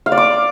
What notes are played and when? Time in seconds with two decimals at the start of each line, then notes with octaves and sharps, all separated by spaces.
0.06 F5
0.12 D5
0.18 D6